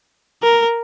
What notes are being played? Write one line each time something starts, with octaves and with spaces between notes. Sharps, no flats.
A#4